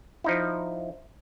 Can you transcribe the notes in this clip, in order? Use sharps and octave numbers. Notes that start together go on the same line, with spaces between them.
F3 D#4 E4